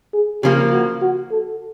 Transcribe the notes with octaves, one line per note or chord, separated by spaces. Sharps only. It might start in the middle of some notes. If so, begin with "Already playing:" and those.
G#4
C#3 F3 A#3 G4
F#4
F#4
A4